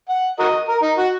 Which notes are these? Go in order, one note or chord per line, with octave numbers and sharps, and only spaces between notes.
F#5
F#4 A#4 D#5
A#4
D#4
F#4